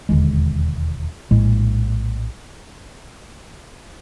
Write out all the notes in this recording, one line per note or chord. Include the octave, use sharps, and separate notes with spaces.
E1 D#2 D3 G#3
A#1 A2 G#3